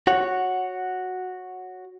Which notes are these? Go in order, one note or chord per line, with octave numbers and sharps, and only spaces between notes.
F#4 C#5 F#5